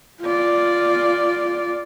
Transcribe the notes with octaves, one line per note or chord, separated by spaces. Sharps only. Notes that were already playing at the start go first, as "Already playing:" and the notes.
F4 D5